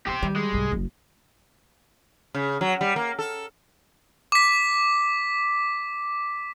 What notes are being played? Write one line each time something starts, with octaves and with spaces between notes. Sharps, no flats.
E2 G2 G4 C5
D#3 G3
G#3
C2 G#2
F#1 F#3
C#3
F#3
G3
A#3
A4
D6 B6